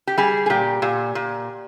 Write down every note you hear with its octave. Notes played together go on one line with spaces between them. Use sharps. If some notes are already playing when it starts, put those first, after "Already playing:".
G4
G3 G#4
G#4
A#2 G4
A#2
A#2